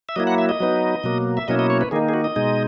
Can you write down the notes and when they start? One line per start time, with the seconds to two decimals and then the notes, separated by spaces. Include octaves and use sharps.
0.09 E5
0.16 F#3 A#3 E4 D#5
0.27 F#5
0.38 E5
0.49 D#5
0.60 F#3 B3 D#4
1.04 B2 F#3 A#3
1.37 E5
1.48 B2 F#3 A#3 C#4 E4 D#5
1.59 D#5
1.70 C#5
1.81 B4
1.91 D#3 A#3 D#4 G#4
2.09 G#4
2.14 F#4
2.24 D#5
2.36 B2 G#3 D#4